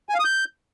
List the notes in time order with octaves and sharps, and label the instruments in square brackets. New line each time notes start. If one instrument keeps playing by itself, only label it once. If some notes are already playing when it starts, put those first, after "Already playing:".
[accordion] G#5
F5
D#6
G6